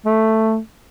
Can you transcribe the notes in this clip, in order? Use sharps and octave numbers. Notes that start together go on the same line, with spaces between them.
A3